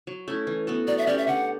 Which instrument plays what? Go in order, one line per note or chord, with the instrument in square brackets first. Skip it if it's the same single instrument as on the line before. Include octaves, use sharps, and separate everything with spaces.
[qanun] F#3
A3 C#4 E4
E3
B3 F#4 A4
[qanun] F#3 [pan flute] D5
[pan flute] E5
[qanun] C#4 G4 C#5 [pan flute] D5
[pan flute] E5
[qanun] D3 [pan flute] F#5